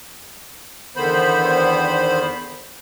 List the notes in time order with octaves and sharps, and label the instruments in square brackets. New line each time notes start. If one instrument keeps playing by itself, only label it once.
[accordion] E2 D3 D#3 B3 C5 B5